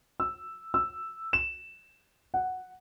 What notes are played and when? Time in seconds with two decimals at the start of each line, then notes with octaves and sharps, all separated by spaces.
0.20 E6
0.74 E6
1.33 E7
2.34 F#5